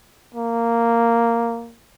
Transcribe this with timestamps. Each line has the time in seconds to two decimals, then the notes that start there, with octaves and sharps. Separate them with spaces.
0.35 A#3